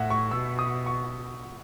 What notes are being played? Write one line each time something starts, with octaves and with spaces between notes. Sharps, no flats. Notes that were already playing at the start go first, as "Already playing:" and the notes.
Already playing: A2 E5 F#5
C#6
B2 E6
D#6
C#6